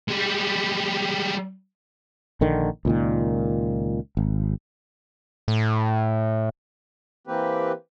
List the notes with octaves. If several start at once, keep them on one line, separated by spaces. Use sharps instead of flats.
G3 G#3
A#1 D3 D#3
C#2 A#2 D#3
G#1
A2
E3 A#3 C4 G4 B4